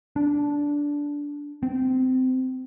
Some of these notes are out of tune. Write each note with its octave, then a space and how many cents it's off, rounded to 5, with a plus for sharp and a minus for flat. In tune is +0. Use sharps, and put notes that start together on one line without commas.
D4 -15
C4 -25